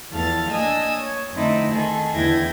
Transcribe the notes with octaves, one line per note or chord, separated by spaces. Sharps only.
E2 F3 A4 F5 F6 A6
A#3 D4 D#5 G#5 D#6 E6
C#5
F2 D3 A3 C4 D#4 E4
D#3 G#4 A4
E2 D3 E4 G5 G#6 A#6